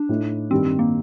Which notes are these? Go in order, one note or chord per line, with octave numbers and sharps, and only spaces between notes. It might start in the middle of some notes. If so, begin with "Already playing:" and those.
Already playing: D4
A2 A3 D#4
G2 D#3 G3 C4 D4
C4
A#3